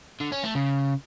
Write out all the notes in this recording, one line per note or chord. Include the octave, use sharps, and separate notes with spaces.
D3
C#4
A3
C#3